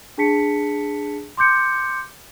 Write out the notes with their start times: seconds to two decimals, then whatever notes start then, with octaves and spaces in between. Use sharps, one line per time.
0.18 D4 G#4 A5 B6 C#7
1.37 C6 D6 G6 C#7